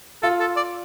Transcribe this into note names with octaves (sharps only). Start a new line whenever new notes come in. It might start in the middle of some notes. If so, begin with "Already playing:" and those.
F4 A4
A4
D5